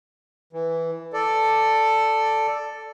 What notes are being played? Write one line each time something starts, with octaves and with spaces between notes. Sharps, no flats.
E3
A4 D5